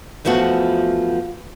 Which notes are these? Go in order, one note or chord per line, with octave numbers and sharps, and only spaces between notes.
E2 F3 A3 B3 F#4